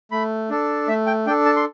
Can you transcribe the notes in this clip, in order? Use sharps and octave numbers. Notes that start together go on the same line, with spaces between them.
A3 B5
D4 A4
A3 E5
G5
D4 A4 G5
A5
C6